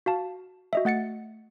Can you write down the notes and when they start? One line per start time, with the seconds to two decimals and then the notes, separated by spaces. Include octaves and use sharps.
0.06 F#4 F5 A5
0.73 F#4 D#5 E5
0.85 A3 F#5 A6 C#7